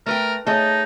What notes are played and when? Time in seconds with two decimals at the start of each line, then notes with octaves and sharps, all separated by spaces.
0.06 A3 A#4 B4 G5
0.46 A3 D#4 G#4 C#5 D#5 A5